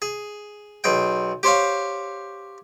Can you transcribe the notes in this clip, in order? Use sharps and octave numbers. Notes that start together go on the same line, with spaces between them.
G#4
B1 G#4 G5
G4 C5 C#5 F5